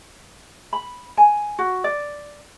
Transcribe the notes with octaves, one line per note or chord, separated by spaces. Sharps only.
B5
G#5
F#4
D5